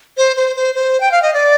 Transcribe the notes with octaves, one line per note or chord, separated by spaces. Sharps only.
C5
C5
C5
C5
G5
F5
D#5
D5